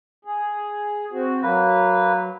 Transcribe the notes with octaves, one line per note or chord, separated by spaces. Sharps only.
G#4
C4 F#4
F#3 A#3 B4